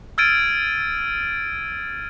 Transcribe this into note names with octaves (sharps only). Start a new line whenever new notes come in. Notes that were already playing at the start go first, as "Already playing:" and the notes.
E6 F6 G#6 A6 D7 D#7